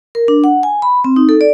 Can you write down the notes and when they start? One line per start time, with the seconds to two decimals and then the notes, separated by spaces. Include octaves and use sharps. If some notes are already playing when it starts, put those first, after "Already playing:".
0.15 A#4
0.28 D4
0.44 F#5
0.63 G#5
0.82 B5
1.04 C4
1.16 D#4
1.29 A4
1.41 D5